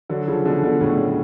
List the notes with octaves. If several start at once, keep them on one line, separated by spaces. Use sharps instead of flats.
D3 F#3
C#3 F3
B2 D3
B2 D3
A2 C#3